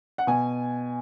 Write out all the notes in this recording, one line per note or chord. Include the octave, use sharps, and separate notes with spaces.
F#5
B2 G#5